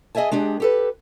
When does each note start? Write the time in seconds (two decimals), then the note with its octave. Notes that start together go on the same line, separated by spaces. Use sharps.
0.15 G#4 D#5 E5 G#5 A5
0.31 G#3 D4 G4 G#4
0.60 G4 A4 B4